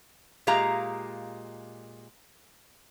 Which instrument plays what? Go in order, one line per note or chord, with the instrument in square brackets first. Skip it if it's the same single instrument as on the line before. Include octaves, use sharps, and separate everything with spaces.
[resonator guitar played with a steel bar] A#2 G#3 G4 D#5 F5 A#5